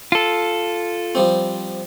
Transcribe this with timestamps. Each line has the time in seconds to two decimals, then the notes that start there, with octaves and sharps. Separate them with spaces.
0.12 F4 A4
1.15 F3 G3 C4